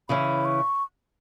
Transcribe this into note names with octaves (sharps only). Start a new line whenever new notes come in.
C#3 E3 C#4 B5
C#6